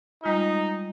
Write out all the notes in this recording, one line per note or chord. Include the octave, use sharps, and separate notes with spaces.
G3 G#3 D#4 F4